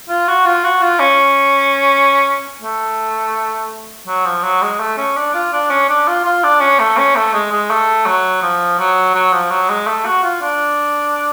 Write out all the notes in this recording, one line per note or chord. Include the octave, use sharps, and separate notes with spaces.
F4
F#4
F4
F#4
F4
C#4
A3
F#3
F3
F#3
G#3
A3
C#4
D4
F4
D4
C#4
D4
F4
F4
D4
C#4
A3
C#4
A3
G#3
G#3
A3
F#3
F3
F#3
F#3
F3
F#3
G#3
A3
F#4
F4
D4